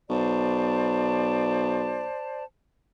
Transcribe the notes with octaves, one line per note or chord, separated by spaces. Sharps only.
B1 C5 D5 A5